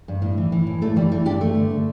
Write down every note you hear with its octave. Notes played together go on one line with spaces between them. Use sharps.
G2
A2
E3
E3
A2
G2 A3
E3 G3
E3 A3
G2 D4 G4
G2 A3
D3
D3